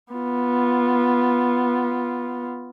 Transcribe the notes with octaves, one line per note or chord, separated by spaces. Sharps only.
B3 F4